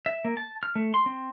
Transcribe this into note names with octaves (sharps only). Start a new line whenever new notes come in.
E5
A#3
A5
F6
A3
C6
C4